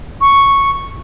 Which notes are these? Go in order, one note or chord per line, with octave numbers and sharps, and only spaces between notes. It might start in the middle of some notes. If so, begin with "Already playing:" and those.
C#6